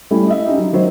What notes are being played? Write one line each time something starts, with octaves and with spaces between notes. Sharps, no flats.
G3 A3 C#4 E4 G4
D#5 E5
C#4 D#4 G4
F#3
D#3 F#3 C5